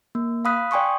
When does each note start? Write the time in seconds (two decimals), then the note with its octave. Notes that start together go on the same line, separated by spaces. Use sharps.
0.15 A#3
0.45 F5 B5 D#6 F#6 B6
0.71 D5 G5 G#5 C6 C#6 D#6